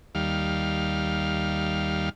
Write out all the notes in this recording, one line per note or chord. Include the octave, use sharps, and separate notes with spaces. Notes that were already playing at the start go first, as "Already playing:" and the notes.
D#2 G3 F5